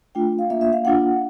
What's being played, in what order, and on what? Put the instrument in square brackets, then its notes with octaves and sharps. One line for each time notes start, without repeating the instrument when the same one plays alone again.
[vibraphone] A3 D4 F4 G5
F5
A#3 D4 F4 E5
E5
F5
A#3 D4 F4 F#5